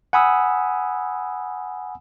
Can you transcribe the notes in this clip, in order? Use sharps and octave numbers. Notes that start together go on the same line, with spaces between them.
F#5 G#5 B5 D#6 E6